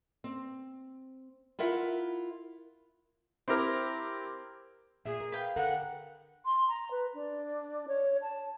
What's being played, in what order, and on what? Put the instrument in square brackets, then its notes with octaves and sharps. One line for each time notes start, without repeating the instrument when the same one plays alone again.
[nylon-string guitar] C4
E4 F4 A#4 E5 F#5
[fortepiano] C4 E4 G4 A#4
[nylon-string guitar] A#2 E5 [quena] G#4
[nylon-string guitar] A#4
[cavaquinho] B4 F5 G5
[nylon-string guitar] D3 A4 A#4 [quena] F#5
[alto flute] C6
A#5
B4
D4
C#5
A5